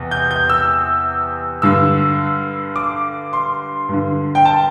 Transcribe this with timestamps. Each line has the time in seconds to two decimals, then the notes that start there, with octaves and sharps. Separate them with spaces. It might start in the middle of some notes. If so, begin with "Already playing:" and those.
Already playing: E2 C3
0.11 G6
0.31 G6
0.50 E6
1.62 G2 D3 E6
2.76 D6
3.33 C6
3.89 G2 D3
4.35 G5
4.45 A5